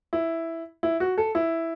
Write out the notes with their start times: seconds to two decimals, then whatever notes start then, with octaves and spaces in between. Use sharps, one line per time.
0.13 E4
0.83 E4
1.00 F#4
1.18 A4
1.35 E4